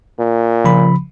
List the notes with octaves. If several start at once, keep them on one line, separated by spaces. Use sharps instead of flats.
A#2
C#3 F3 B5